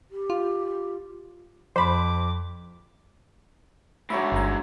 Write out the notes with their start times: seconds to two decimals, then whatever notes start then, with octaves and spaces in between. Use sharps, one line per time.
0.11 G4
0.30 F4
1.76 F2 C5 B5 D6
4.10 G#2 D3 F#3 C#5 E5 B5
4.32 G1 A#5